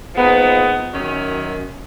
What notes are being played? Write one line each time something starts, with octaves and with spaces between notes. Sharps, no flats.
A#2 F3 G#3 B3 D#4
F#2 D#3 F#3 C#4